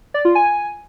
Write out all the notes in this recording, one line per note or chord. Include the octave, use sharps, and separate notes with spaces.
D5
F4
G#5